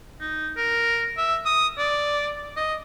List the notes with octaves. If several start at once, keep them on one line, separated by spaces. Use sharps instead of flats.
D#4
A#4
E5
D#6
D5
D#5